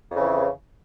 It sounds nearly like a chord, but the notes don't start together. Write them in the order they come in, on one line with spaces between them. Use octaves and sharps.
F2 C#3 E3